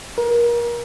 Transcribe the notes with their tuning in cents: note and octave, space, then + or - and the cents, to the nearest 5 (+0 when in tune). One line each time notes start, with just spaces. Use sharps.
A#4 +30